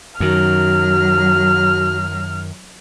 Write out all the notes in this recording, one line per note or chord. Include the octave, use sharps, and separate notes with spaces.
F#2 D#3 F#3 F#4 F6